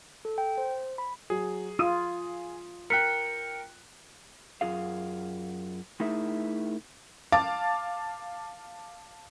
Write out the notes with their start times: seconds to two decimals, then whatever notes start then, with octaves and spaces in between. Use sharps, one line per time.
0.25 A4
0.38 G5
0.58 C5
0.98 B5
1.30 F#3 G#4
1.79 F4 D#6 D#7
2.90 A#4 G5 F#6 B6 C#7
4.61 F#2 F4 G#4 F5
6.00 A3 D#4 E4 G#4 A#4 E5
7.32 F5 A5 D6 A6